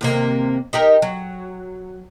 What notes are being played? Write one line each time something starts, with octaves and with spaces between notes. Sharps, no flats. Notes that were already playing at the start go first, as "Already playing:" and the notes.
D#2 C3 A#3
D#4 G4 A#4
F#3